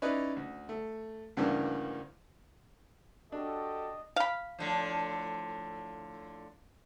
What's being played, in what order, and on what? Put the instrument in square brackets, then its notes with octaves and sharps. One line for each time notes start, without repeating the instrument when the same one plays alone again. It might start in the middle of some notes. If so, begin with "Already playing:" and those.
[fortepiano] C#4 D#4 E4 B4 D5
D2
A3
D2 G2 C#3 E3 A#3 D4
[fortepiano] D4 [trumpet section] F#4 G4 A4 [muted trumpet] D#5
[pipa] F5 B5
[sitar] A2 D3 F3